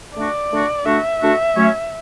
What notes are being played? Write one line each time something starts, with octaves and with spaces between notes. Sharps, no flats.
D3 A3 D4 F#4 D5
D3 A3 D4 F#4
D3 A3 D4 F#4 E5
D3 A3 D4 F#4
F#3 A3 C#4